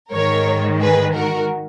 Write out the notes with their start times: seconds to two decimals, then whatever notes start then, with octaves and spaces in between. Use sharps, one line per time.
0.11 G#2 D#3 A#4 C#5
0.80 G#4 B4
1.15 F#4 A#4